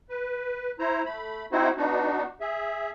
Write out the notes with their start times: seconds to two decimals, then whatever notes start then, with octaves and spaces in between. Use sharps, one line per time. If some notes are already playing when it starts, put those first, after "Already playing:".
0.09 B4
0.79 E4 C5 A#5
1.05 A3 B5
1.52 C4 D#4 E4 F#4 C5
1.77 B3 D4 D#4 F#4
2.40 G#4 E5